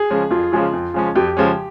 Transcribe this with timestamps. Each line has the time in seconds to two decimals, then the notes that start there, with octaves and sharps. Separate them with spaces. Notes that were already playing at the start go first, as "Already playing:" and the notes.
Already playing: G#4
0.10 C#3 F3 G#3 C#4
0.31 F2 F4
0.52 C#3 F3 G#3 C#4 F4
0.73 F2
0.94 C#3 F3 G#3 C#4
1.16 F2 G4
1.37 C#3 F3 G#3 C#4